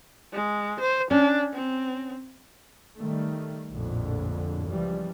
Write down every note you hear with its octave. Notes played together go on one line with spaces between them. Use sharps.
G#3
C5
C#4 D4
C4
D#3 G3 A3
A#1 F2 A2 D3
C#2 E3 F3 G3